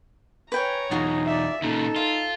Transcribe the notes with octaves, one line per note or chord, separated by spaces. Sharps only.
B4 C#5 G5 G#5 A#5
B1 E2 D#4 F4 F#4 G#4
D5 E5
A#2 C#3 D#4 A4
F4 E5